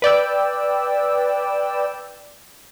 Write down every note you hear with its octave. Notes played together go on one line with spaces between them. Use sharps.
B4 D5 G5 E6